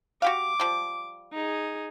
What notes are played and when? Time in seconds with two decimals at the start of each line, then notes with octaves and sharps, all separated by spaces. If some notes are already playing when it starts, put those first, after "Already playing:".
0.22 F#4 G4 F5 D6
0.60 F3 G3
1.33 D#4 G#4